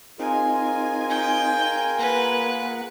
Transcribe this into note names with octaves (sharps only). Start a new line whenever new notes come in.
C4 D#4 F4 G#4 A#4 G#5
G5
A#3 B4 F#5